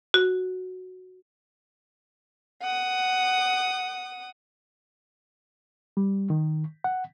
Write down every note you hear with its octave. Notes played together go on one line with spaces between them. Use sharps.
F#4
F#5 D#6
G3
D#3
F#5